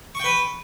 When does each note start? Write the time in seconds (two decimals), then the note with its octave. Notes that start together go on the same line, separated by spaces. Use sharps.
0.15 C#6
0.20 G5
0.24 B4